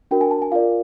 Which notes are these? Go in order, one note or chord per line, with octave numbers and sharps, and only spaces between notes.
D4 F#4 A#4 G5
G#5
A5
G#5
F4 A#4 D5 F5